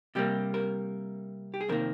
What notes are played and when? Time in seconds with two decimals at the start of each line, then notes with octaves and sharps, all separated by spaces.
0.15 C3 G3 A#3 G4
0.54 A#4
1.54 G4
1.61 G#4
1.69 F2 C3 D#3 A#3 A#4